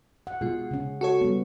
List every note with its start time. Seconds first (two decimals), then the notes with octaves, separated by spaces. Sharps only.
0.27 F#5
0.41 B2 G#3 F4 G#4
0.71 C#3 C#4
1.01 F#4 A4 C#5
1.21 G3 B3